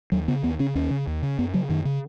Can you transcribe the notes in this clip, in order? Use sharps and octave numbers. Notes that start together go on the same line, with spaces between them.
D#2 F#3
C#3 B3
D#2 B3
C#3 C#4
D#2 C#4
C#3
D#2
C#3
F#2 B3
C#3 F#3
F#2 D#3
C#3